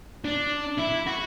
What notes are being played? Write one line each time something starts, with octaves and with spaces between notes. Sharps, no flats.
D4
E4
F#4